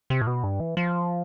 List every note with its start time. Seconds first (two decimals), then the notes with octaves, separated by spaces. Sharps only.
0.10 C3
0.21 A2
0.27 B2
0.44 G2
0.60 E3
0.77 F3